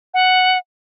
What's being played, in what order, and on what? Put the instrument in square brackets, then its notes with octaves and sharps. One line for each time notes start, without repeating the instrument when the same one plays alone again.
[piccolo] F#5